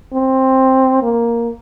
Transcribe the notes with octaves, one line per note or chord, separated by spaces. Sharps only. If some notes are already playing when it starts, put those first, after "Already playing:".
C4
A#3